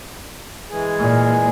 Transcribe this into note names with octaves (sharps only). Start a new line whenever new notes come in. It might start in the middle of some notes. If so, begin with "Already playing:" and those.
E3 G#3 G#4
A#2